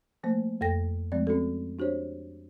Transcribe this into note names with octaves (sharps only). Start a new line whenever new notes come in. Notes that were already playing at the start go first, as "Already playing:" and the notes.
F3 A3 A#3 C5
F2 A4 G5 A#6
F3 G#3 A3 C4 D5
C4 C#4 F#4 A4
D4 F#4 G4 C5 C#5